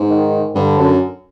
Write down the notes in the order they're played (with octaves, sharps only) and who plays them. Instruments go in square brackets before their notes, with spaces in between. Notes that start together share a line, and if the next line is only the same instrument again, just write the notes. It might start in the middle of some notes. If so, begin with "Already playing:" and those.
Already playing: [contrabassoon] G#2
[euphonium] D#3
[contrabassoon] G2 [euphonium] D3
[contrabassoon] F#2